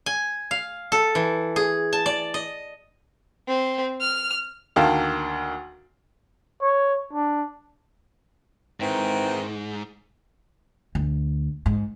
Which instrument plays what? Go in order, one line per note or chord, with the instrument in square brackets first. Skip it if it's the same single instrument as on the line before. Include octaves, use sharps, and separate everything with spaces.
[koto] G#5
F5
A4
E3
G#4
A5
D5
D#5
[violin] C4
F6
[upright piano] D2 D#3 A#3 F5 G5 A5
[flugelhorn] C#5
D4
[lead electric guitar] G#2 [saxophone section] D#3 E3 C4
[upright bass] D2
G#2